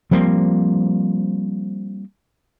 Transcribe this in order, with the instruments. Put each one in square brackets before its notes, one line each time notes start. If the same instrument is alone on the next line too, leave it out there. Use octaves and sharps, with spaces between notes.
[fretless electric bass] F3 G3 A#3 C4